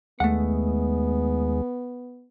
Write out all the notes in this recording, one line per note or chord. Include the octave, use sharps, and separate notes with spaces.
D#2 G#3 A3 B3 F#5